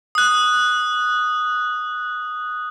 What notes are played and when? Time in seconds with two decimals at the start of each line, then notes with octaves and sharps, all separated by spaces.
0.15 D#6 F#6